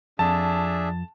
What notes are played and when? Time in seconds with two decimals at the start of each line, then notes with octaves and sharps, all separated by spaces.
0.19 F2 D4 G#4 E5 A5